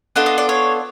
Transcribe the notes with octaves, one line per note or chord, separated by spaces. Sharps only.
B3 D4 F4 A4 D#5
D#5
D5
C#5